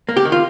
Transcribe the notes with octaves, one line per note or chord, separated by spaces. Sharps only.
A#3
G4
D#3
F4